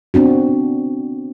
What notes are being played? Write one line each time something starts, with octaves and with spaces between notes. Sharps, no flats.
B3 C4 D4 F#4